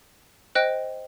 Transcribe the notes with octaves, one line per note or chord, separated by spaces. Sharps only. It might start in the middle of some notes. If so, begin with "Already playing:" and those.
C5 D#5 G5 F#6